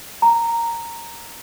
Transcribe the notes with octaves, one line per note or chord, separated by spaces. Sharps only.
A#5